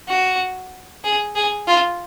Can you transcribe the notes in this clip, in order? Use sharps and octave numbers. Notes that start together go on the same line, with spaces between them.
F#4
G#4
G#4
F4